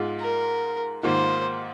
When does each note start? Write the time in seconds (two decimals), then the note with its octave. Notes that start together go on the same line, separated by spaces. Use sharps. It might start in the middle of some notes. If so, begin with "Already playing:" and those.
Already playing: G#2 G#3 F4
0.20 A#4
1.03 G#2 D#3 A#3 F4 C5